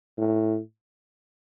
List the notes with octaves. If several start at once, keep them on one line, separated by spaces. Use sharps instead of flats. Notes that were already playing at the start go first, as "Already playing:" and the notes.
A2